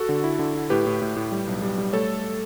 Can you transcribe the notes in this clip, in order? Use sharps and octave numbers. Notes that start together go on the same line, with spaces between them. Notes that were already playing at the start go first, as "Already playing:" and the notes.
Already playing: F#4 A4
D3
E4
D3
E4
A2 G4 B4
A2
A2
A2
G3
B1
G3
G3
A3 A4 C#5